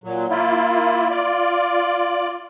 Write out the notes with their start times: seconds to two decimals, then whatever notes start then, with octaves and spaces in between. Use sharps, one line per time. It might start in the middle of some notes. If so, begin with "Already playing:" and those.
0.04 A#2 F#3
0.30 A#3 E4 F4
1.10 F4 D5